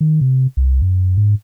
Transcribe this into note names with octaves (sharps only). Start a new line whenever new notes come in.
D#3
C3
C2
F#2
G#2